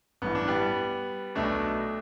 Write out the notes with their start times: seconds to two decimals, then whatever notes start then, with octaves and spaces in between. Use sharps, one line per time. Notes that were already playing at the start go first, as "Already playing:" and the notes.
0.22 A1 G2 E3 B3
0.35 D4
0.47 G3 B3
1.35 B1 B2 A3 D4